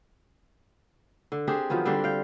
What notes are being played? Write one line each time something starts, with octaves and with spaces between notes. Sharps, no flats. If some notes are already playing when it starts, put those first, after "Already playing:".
D3
C4 D4 G4 G#4
D#3 F3 F#3 B3
D3 G3 C4 D4
F5 G5